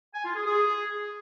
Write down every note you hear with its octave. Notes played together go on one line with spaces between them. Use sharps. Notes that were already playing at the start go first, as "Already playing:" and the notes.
G#5
F4
G#4
G#4